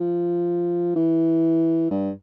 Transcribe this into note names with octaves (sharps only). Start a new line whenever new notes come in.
F3
E3
G2